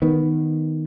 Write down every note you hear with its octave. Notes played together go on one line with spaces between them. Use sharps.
D#3 B3